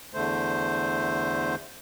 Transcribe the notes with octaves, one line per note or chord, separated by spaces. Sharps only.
E2 D3 A3 C5